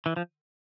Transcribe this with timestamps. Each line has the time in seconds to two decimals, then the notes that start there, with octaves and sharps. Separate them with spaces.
0.06 E3
0.16 F3